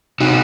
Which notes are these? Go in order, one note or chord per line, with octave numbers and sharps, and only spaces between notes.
C3 D#4 F#4